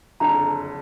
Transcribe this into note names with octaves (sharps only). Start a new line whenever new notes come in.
F#1 F2 D3 A#5